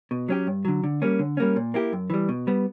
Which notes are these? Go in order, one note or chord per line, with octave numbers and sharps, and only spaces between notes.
B2
F#3 C#4 G4
G2
D3 F#3
D3
G3 A#3 C#4
D3
G3 A#3 C#4
A#2
A#3 E4 G4
F#2
E3 G3
B2
G3 B3